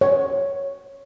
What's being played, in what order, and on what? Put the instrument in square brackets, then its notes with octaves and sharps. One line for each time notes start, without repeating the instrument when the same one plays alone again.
[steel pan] C#5